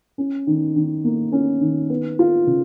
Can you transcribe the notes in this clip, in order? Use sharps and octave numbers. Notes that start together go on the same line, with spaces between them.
C#4
D#3
D#3
A#3
C#4
D#3
B3
F4
C#3